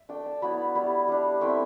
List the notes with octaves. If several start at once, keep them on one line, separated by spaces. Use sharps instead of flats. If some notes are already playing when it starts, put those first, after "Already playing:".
Already playing: E5
A3 D4 G5
A5
F#3 B3 E4 B5
G3 B3 E4 B5
G3 D4
A3 C4 E4 G5
E5